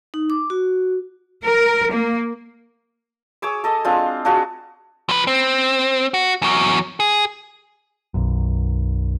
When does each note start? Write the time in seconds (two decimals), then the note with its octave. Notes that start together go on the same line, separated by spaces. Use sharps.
0.14 D#4
0.30 D6
0.50 F#4
1.44 A#4
1.92 A#3
3.42 G#4 C#5 D6 E6
3.64 A4 D#5
3.85 G#3 C4 D4 F4
4.25 D4 F4 F#4 G#4
5.09 F3 B4
5.27 C4
6.14 F#4
6.42 E2 F#3
7.00 G#4
8.14 B1 F#2